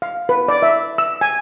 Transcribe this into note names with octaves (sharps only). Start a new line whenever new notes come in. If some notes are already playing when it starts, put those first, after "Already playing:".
F5
B4
D5
E5
E6
G#5